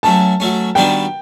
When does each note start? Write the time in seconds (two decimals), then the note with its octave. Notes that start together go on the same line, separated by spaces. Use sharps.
0.03 F#3 A3 C#4 A5
0.40 F#3 A3 C#4
0.75 D#3 G3 B3 D4 F#4 G5